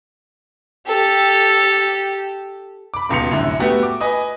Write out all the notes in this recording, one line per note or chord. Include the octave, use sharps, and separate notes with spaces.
G4 A4
B5 D6
D#1 C#2 B2 C6 C#7 F7
C2 F#2 A2 D3
A3 B3 F#4 G4 A4
D6
B4 D#5 G#5 D#6